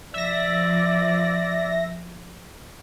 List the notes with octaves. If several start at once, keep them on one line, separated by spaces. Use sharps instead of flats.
F3 D5 E5 A#6